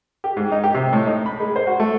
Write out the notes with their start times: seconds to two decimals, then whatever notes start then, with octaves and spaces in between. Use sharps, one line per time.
0.24 G4
0.37 G#2
0.52 D#4
0.64 G4
0.75 C3
0.93 A2
1.07 D#4
1.26 B5
1.40 G#3
1.56 C5
1.67 F#4
1.80 A3